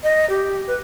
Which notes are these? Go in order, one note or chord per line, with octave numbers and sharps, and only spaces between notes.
D#5
G4
B4